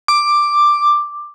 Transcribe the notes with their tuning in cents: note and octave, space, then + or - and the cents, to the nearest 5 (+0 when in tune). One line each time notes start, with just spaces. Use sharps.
D6 +5